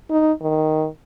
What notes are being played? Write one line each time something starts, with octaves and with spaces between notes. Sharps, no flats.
D#4
D#3